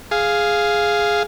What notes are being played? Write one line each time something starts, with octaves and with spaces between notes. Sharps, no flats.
G#4 F5